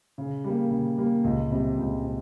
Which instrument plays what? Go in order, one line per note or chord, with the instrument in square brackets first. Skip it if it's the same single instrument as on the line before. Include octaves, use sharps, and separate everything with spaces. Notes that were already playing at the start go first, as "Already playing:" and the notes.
[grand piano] C#3
G3 A#3
C#3
G3 A#3
C#2
C3 G3
C#2
C3